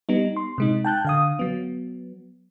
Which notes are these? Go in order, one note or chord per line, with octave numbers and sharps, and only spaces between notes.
G3 B3 D#4
C6
C3 G#3 D#4
G5 A5 F#6 G6
D3 F5 D#6
F#3 B3